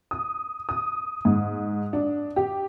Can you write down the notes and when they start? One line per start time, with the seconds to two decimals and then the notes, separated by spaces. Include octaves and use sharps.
0.11 D#6
0.69 D#6
1.25 G#2
1.93 D4
2.36 G4